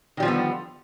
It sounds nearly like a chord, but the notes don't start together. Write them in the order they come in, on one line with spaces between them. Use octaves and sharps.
D#3 G3 F3 D3 B3